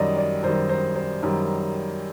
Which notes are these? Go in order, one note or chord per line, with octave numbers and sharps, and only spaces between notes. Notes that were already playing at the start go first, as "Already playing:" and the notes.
Already playing: F#2 D#3 G3 D5 D#5
D5
F#2 D#3 G3 C5
C5
C5
F#2 D#3 G3